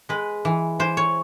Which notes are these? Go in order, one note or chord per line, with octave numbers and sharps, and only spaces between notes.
G#3 B4
E3
E3 C5
C#5